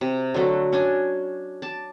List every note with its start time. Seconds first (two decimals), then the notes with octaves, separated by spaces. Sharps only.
0.01 C3
0.34 D3 F#3 A3 F#4
0.72 C#4 D4 G#5
1.62 A5 D6